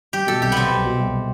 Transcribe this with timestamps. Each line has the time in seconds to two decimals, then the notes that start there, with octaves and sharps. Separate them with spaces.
0.13 G3 G4
0.27 B2 A4
0.41 C2 G4
0.52 C2 B3 C4
0.71 C2
0.84 B2
0.99 C2